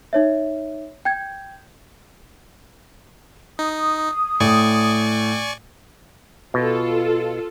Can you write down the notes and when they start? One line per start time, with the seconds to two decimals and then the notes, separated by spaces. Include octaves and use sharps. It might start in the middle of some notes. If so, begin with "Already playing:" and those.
0.13 D#4 C#5 E5
1.05 G5 G6 G#6
3.59 D#4 D#6
4.40 A2 D5 G#5 C#6
6.54 B2 F4 A4